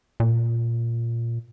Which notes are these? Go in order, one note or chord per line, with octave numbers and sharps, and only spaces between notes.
A#2